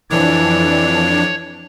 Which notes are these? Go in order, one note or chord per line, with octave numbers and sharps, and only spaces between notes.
F2 E3 D4 C#5